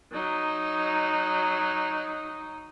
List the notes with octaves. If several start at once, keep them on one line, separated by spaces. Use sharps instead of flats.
F#3 D#4